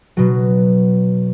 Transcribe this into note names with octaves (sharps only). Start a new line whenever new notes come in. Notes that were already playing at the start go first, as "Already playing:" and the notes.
B2 F#3